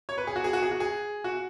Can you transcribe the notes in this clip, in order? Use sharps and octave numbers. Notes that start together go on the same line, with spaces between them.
C#5
B4
G#4
F#4
G#4
F#4
G#4
F#4
G#4
F#4